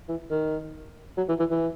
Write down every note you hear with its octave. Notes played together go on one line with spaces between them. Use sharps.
E3
D#3
F#3
E3
E3
E3